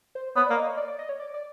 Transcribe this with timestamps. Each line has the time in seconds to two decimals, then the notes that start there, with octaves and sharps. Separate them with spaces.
0.15 C5
0.36 B3 C#5
0.46 D5
0.50 A#3
0.57 D#5
0.67 C#5
0.78 D5
0.88 D5
0.99 D#5
1.09 C#5
1.20 D5
1.34 D5